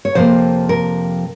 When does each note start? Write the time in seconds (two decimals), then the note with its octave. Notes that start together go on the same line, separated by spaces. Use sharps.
0.05 C#5
0.15 F2 C3 F3 A#3 C5
0.69 A#4